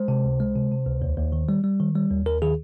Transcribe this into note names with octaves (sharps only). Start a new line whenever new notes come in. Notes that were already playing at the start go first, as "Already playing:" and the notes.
Already playing: G#3 C5
C3
C#2
G#3
C3
C3
C#2
D#2
D#2
D#3
G3
G3
D#3
G3
D#2
D#2 A#4
D#3 G#4